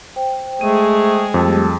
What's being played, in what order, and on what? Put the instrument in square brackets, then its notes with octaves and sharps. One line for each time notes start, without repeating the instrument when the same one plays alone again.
[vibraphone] C5 G5
[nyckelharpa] G#3 G#4 [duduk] A3 [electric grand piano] D#7
[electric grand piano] F2 [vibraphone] G3 A3 G4 [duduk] A4